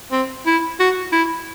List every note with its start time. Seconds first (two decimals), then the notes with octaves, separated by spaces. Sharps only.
0.12 C4
0.46 E4
0.80 F#4
1.12 E4